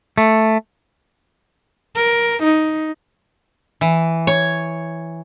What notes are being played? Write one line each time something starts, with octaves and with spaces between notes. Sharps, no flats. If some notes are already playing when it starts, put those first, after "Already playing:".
A3
A#4
D#4
E3
C#5